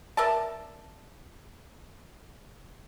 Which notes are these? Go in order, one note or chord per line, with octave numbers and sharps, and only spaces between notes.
A#4 D5 E5 A5